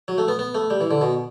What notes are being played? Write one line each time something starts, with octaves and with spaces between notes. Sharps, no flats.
F#3
A3
B3
B3
A3
G3
E3
D3
B2